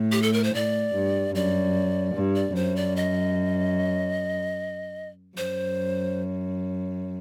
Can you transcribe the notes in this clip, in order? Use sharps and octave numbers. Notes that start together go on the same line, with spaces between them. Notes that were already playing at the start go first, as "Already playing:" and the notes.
Already playing: A2
G4
A4
A#4
C5
A2 D5
G2
F#2 D5
G2
D5
F#2 C5
D5
D#5
F#2 C5